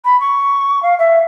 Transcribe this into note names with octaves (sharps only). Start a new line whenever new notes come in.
B5
C#6
F5
E5